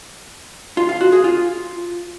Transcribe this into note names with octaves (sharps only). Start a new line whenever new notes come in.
F4
F5
F#4
G#4
F4